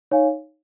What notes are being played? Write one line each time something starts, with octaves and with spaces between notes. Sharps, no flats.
D#4 C#5 F5 G#5